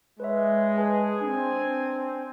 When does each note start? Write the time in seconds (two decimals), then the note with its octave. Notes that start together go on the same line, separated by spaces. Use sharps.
0.20 G#3 B4 C#5 E5
0.77 G#4 B4 G#5 A5
1.21 C4 D4 G#5